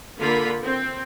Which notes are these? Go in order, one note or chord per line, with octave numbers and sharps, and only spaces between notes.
D3 A#3 F4 A#4 B5
C4